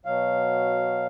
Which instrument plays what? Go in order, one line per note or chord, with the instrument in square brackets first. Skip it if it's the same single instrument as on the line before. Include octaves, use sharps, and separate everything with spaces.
[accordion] B2 F#3 F5